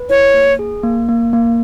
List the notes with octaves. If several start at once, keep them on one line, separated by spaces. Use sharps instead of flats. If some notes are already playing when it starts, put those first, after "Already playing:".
Already playing: B4
E4 C#5
A#3
G#4
A#3
A#3
A#3